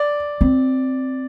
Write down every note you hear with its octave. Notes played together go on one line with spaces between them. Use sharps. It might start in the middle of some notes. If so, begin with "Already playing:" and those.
Already playing: D5
C4